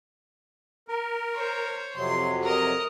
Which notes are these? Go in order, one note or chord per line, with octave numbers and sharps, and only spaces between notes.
A#4
C5 C#5
F2 C3 F#3 C6
A#4 D#5